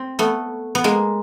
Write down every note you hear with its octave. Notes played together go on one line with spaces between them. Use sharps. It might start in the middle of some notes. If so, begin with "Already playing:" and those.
Already playing: C4
A3 B3
B3
G#3 A#3